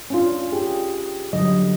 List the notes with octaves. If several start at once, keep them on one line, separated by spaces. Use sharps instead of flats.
C#4 D4 F4
G4 G#4
D3 F#3 G3 D#5